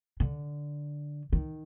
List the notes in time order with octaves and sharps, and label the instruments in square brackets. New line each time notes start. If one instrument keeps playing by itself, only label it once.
[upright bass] D3
D#3